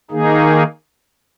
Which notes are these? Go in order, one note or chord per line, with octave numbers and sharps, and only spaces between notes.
D#3 A#3 D#4 G#4